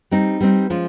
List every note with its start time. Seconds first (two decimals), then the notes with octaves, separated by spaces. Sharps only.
0.11 G3 C4 D#4
0.41 G3 C4 D#4
0.70 F3 G#3 C#4 F4